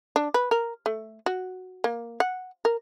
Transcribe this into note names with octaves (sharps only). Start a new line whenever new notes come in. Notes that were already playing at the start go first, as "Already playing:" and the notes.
D4
B4
A#4
A3
F#4
A#3
F#5
A#4